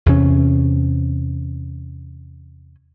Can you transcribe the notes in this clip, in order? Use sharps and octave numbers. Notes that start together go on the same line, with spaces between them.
E2 C3 C#4